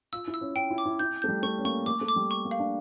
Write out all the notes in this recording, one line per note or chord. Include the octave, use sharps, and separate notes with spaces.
F4 E6
E4
E6
C#4
C#4 G5
E4
D6
E4
E4 G6
A3 G6
G3
A3 C#6
C#4
A#3 C#6
A#3 D6
A3
D6
G3
C#6
A#3
F5
D4